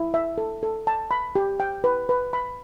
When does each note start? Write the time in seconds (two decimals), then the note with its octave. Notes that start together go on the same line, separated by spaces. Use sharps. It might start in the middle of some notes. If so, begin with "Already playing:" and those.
Already playing: E4
0.14 E5
0.38 A4
0.63 A4
0.87 A5
1.11 B5
1.35 G4
1.60 G5
1.84 B4
2.09 B4
2.33 B5